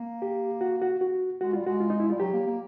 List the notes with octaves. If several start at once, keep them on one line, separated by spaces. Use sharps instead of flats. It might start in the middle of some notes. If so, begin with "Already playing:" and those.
Already playing: A#3
G4
F#4
F#4
F#4
G#3 F#4
G3 F4
G#3 F#4
F4
D#4
E4
G3 F4
F#3 G4
A#3
A#3